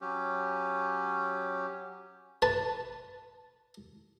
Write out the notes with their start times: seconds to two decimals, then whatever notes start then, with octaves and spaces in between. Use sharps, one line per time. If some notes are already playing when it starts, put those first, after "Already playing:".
0.01 F#3 C#4 G4
2.42 B4 A5